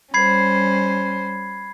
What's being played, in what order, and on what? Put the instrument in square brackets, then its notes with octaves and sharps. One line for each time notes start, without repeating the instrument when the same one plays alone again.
[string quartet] G3 C#4 C5 [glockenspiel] B5 G#6 C7